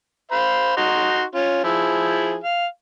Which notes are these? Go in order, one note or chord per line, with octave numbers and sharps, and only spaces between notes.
C5 F5 B5
D#4 F#4 C6
C#4 F4
F3 E4 G#4
F5